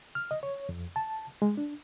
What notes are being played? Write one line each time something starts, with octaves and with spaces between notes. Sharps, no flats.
F6
D#5
C#5
F2
A5
G#3
D4